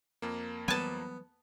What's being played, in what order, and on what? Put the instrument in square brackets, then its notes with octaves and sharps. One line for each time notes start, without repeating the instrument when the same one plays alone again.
[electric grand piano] F2 A#3
[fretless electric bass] E3 F#3 G3 [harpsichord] B3 [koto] G#5 A5